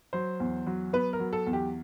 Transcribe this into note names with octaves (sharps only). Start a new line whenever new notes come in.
F#3 C5
E2
F#3
B3 B4
A#4
F#3
A4
E2
G4